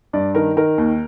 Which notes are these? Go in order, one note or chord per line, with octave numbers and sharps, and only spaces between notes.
G2 D5
D#3 A#4
D#3 A#4
D#2